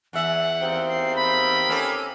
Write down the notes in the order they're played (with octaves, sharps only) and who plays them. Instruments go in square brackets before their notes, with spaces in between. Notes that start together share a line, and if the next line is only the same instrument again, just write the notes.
[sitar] E2 E5 [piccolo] F#5
[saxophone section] D#2 C4
[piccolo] C7
B5
[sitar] A#3 C#4 A4